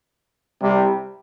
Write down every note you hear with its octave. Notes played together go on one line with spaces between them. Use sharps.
C2 C3 G3